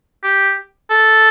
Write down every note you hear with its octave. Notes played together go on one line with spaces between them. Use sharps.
G4
A4